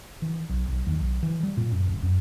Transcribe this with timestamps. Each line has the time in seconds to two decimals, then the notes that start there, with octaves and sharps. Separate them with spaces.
0.22 E3
0.49 B1
0.68 B1
0.87 D#2
1.00 B1
1.23 E3
1.43 G3
1.57 A#2
1.72 F#2
1.87 D1
2.03 F#2